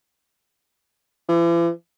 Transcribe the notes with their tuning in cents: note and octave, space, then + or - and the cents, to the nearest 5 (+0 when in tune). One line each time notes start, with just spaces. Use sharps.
E3 +45